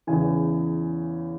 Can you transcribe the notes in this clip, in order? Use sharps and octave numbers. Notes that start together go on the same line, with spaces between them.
E2 C#3 E3 G#5